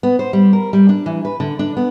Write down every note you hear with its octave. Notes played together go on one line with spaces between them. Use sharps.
B3
C5
G3
A#4
G3
D4
E3
B4
D3
D4
B3